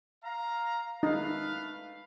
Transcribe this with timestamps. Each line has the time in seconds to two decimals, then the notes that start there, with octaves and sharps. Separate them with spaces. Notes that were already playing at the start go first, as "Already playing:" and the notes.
0.23 F5 A#5
1.03 A3 D#4 B4 F5